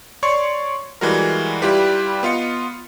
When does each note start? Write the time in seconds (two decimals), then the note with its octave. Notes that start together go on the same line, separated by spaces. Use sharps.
0.23 C#5 D5 C6 C#6
1.01 E3 G3 G#3 F#4 A#4
1.62 G3 E4 F4 G4 B4
2.23 B3 F4 D#5 C#7